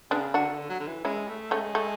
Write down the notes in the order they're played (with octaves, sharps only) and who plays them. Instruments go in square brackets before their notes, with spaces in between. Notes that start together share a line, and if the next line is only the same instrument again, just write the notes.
[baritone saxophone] C#3 [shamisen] B3 D4
[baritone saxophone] D3 [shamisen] D4 F#4
[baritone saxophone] C#3
D3
F#3
D3
E3
[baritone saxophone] G#3 [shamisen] C#4 E4
[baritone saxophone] A3
[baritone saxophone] G#3 [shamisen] A3 C#4
[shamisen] A3